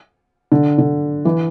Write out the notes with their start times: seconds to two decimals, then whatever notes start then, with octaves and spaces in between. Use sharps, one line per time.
0.52 D3
0.78 D3
1.25 E3